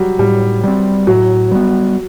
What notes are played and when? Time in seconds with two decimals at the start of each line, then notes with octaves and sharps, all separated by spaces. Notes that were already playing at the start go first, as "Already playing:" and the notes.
Already playing: F#3 G3
0.19 A2 G3
0.64 G3 C4
1.07 A2 F#3
1.51 G3 B3